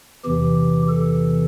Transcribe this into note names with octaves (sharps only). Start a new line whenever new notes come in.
E2 C3 E3 G4
A4